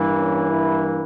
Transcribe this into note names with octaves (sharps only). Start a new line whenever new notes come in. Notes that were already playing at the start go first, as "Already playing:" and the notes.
Already playing: G2 E3 A#3
C#4
E4